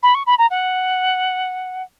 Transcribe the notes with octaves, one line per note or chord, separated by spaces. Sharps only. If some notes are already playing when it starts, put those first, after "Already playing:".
B5
C#6
B5
A#5
F#5